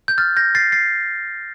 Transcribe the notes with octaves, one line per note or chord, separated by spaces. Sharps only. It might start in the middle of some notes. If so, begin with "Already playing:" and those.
G6
F6 A6
G6 A#6
A6 C7
A6 C7